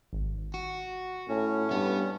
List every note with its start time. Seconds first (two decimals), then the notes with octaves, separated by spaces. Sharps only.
0.13 G#1
0.54 F#4
1.29 A2 C#4
1.71 G2 B3